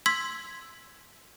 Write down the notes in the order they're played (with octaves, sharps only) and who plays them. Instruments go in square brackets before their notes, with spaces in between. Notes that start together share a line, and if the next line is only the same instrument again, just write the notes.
[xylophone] C6 E6 G#6 B6